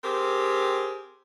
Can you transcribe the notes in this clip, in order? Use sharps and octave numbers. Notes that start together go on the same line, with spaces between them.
C4 G4 G#4 A#4